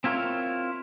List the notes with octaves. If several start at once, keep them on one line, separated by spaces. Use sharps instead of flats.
C4 E4 F4 A#4 C#5